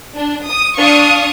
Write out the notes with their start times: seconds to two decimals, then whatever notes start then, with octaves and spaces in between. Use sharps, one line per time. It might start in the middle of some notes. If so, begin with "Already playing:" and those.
0.16 D4
0.48 D#6
0.77 D4 F5 C#6 D#6